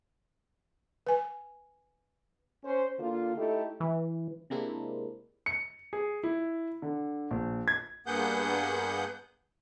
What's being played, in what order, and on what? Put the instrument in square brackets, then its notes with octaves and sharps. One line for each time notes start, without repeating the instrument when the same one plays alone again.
[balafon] B4 G#5
[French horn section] C#4 C5
D3 A#3 F4
A3 D#4 E4 G4 A4
[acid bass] E3
[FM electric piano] C3 G#3 A#3 C4 D4 E4
[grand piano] C#7
G#4
E4
D3
A#1
G#6
[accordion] G2 A#3 B3 G#4 F#5 G6